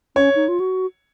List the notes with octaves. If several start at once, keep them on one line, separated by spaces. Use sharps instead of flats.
C#4 C#5
D#4
F4
F#4